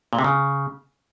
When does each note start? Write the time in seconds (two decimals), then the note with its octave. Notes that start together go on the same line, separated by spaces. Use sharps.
0.13 A#2
0.19 C3
0.24 C#3